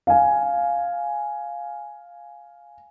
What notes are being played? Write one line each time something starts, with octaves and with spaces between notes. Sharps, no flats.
F5 G#5